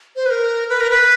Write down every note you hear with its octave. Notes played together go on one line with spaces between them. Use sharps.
C5
B4
A#4
B4
A#4
B4